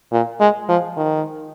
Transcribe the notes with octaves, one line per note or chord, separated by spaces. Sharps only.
A#2
G#3
F3
D#3